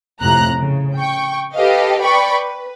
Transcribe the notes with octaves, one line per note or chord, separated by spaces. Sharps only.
F2 A2 C3 A#5 F#6
C#3
G5 C#6
G4 A4 B4 D#5 F5
B4 D5 G5 B5 C#6
B4